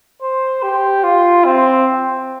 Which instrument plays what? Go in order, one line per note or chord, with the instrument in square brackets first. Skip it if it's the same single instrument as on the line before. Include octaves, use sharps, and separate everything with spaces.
[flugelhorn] C5
G4
F4
C4